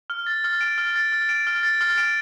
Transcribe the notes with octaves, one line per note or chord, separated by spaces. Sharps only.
F6
A6
F6
D7
F6
A6
F6
D7
F6
A6
F6
D7